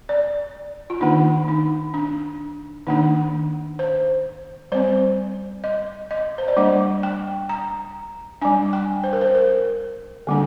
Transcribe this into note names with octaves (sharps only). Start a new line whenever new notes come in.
D5
F4
D#3 A#3 D4 D#4
D#4
D4
D#3 A#3 D4 D#4
C5
G3 C4 C5
D#5
D#5
C5
D5
G3 A#3 D4 D#5
G5
A#5
G3 D4 G#5
G5
C5
A#4
C5
A#4
D3 G3 A#3 D4